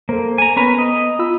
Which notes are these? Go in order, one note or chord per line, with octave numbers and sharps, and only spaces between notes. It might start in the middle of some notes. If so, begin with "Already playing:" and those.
A#3 A4 C5
G#5 A#5
B3 C#4 B4 A#5
D#5
F4 B5 E6